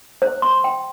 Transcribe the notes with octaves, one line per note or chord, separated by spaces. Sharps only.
C5
C6
G5